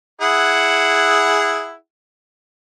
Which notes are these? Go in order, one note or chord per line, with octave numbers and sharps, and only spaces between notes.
E4 G#4 F#5